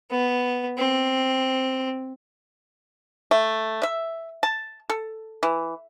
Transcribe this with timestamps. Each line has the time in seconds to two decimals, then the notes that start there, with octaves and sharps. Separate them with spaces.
0.11 B3
0.77 C4
3.31 A3
3.83 E5
4.43 A5
4.90 A4
5.43 E3